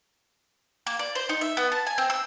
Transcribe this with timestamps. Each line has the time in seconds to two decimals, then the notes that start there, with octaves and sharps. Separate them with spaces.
0.87 A#3
0.99 D5
1.15 C5
1.29 D#4
1.41 E5
1.57 B3
1.72 A5
1.86 G#5
1.98 C4
2.10 E6